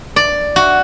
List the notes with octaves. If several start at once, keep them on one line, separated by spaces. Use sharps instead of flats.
D5
F#4